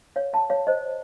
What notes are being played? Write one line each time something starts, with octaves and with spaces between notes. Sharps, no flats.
C#5 F5
F5 A5
C#5 F5
C5 D#5